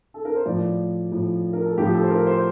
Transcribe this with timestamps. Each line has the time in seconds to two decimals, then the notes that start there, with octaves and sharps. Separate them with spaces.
0.14 A4
0.25 A#4
0.35 C5
0.46 A2 F3 D5
1.12 A2 F3
1.53 A#4
1.65 A4
1.77 A2 F3 G4
1.94 A4
2.03 C5
2.10 A#4
2.27 C5